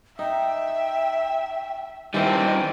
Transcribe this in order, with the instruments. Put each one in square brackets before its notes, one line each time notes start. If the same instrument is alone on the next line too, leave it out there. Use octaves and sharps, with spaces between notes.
[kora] D#4 [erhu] E5 [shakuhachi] G5
[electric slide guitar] D#3 G3 [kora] E3 C4 C5 [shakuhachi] D#5 [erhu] G5